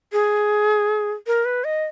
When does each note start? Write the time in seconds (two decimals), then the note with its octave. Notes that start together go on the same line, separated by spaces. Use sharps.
0.12 G#4
1.27 A#4
1.45 B4
1.64 D#5